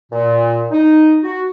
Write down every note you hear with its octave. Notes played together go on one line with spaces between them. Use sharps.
A#2
D#4
F#4